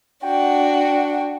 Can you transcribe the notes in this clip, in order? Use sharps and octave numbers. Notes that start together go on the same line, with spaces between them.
D4 F#4 G5